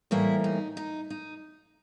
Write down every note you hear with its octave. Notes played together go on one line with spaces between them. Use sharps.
A2 E3 G3 A#3 E4
D#4
D#4
D#4